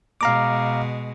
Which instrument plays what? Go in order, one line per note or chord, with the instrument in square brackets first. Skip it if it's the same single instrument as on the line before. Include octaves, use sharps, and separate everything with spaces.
[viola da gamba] B2 G#3 [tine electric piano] F5 A#5 D6